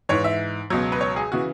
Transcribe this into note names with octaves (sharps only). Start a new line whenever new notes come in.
G#2 E3 C#5
E5
C#2 B2 F#3
B4
C#5
G#4
C#3 E3 F#4